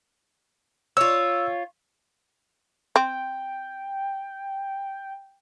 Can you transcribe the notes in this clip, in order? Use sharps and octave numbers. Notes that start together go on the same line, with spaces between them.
F4 C#5 E6
C4 G5